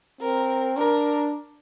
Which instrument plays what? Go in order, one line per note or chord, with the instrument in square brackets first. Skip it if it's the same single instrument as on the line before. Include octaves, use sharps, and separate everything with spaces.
[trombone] C4 [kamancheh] A#4
[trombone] D4 [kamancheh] A#4